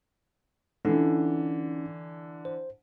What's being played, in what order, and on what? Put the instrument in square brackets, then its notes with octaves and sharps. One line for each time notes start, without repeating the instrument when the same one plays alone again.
[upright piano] D3 E3 [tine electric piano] C#4 D#4
[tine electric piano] C5